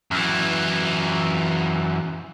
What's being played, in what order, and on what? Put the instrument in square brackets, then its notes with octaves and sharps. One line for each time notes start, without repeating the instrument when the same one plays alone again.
[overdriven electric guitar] F#2 E3